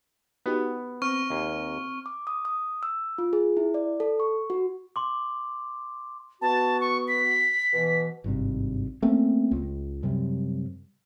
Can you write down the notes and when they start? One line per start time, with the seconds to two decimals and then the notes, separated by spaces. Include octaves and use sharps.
0.46 B3 D#4 F#4 G4
1.02 C4 C#6 F6
1.30 D#2
2.06 D6
2.27 D#6
2.45 D#6
2.83 E6
3.18 F4
3.33 G#4
3.57 E4
3.74 D5
4.00 A4
4.20 C#6
4.50 F#4
4.96 C6 D6
6.42 B3 F#4 A5
6.81 C#6
7.08 B6
7.73 B2 E3
8.24 G#1 G2 C3
9.02 A3 A#3 C4 C#4
9.51 C#2
10.03 F#2 C3 G3